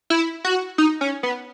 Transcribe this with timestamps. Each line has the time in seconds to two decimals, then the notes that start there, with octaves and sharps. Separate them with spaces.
0.10 E4
0.44 F#4
0.78 D#4
1.01 C#4
1.23 B3